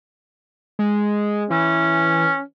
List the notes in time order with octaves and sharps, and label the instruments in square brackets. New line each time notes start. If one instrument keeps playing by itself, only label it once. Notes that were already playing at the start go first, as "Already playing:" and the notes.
[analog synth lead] G#3
[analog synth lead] E3 [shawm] C#4